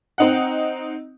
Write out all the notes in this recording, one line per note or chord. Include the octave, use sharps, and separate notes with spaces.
C4 D#4 F#5